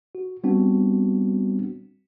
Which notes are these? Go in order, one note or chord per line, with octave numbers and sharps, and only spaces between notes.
F#4
G3 B3 C4 D4 F#4